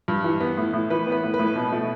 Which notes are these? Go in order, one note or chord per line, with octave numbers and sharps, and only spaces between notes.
G2
E3
B3
A2
A2
E3 B4
B3 B4
A2
B4
A2
B2
A3